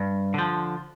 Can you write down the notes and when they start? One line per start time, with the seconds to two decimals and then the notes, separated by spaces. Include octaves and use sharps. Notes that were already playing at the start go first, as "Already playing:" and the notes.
Already playing: G2
0.34 D3 F3